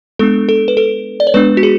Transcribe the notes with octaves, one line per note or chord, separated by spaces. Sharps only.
G#3 B3 D4 A4
A4
B4
A4
D5
C#5
G#3 B3 D4 B4
F#4
G#4